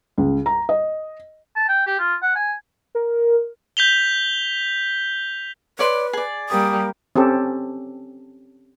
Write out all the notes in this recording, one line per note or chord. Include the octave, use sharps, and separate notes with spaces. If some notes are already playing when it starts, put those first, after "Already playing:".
C#2
A#5
D#5
A5
G5
G4
F4
F#5
G#5
A#4
G6 B6 F7 G7
B4 C#5 D5 C6
G#4 D5
G3 A#3 G4 D#6
C4 C#4 G4 A4